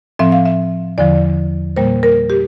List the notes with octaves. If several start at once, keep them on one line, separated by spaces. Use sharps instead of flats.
A2 F3 C4 E5
F5
E5
E2 D3 F3 D5
A#2 G3 A#3 C5
A#4
G4